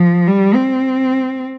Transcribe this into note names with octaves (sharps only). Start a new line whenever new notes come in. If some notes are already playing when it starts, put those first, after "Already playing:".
Already playing: F3
G3
C4